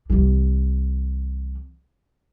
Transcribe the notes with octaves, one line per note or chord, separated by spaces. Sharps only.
C2 E3